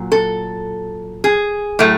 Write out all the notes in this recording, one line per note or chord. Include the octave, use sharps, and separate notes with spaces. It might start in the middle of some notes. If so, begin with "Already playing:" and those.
Already playing: A#2 F#3
A4
G#4
A2 F#3 A3